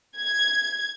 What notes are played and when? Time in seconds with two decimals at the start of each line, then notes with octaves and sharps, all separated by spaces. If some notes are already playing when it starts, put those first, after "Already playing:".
0.18 G#6